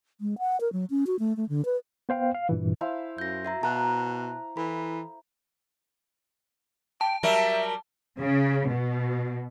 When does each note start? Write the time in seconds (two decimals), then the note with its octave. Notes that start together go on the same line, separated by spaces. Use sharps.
0.21 G#3
0.38 F#5
0.60 A#4
0.72 F#3
0.90 C#4
1.07 F#4
1.19 A3
1.36 A3
1.49 D3
1.65 B4
2.09 B3 C5 F5 G5
2.35 F5
2.49 G2 A#2 E3
2.81 E4 C5 F5
3.18 F#2 G6 A#6
3.45 F#4 E5 A#5
3.63 B2 A5 A#5 F#6
4.57 E3 A4 B5
7.01 G5 A5
7.23 F#3 G3 A#4 E5
8.19 C#3
8.70 B2